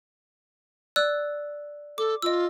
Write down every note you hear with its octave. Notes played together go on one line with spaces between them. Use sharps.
D5 E6 F#6
A4 D6
F4 D#5 E6